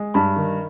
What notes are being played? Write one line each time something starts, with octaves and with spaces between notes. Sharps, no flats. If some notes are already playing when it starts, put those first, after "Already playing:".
Already playing: G#3
G2 B5
D#3